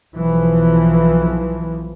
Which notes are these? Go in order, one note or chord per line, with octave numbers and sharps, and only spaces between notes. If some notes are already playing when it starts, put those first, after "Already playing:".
B1 E3 F3